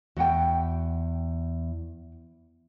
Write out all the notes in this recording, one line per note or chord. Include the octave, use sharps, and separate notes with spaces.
E2 F#4 F#5 G5